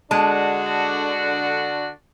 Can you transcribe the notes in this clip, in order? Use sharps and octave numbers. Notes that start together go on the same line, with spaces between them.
D3 G#3 D4 F#4 A5